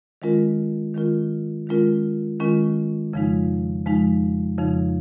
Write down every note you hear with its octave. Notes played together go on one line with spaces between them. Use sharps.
D#3 G#3 C#4 F4 A#4
D#3 G#3 C#4 F4 A#4
D#3 G#3 C#4 F4 A#4
D#3 G#3 C#4 F4 A#4
F2 C#3 F3 G#3 D#4
F2 C#3 F3 G#3 D#4
F2 C#3 F3 G#3 D#4